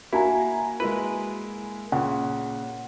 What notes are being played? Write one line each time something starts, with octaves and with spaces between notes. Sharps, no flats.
A#3 E4 F#4 G#5 A#5
G#3 A#3 E4 B4
A#2 C#3 F#5